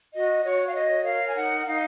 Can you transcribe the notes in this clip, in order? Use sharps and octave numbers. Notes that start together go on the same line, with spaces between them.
F#4 D#5
F#4 C#5
F5
C#5 D#5
A#4 F5
G#5
D#4 F#5
D#4 F5